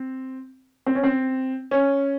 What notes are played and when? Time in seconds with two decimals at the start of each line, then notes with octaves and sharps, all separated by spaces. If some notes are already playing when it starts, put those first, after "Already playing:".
Already playing: C4
0.86 C4
0.95 C#4
1.03 C4
1.71 C#4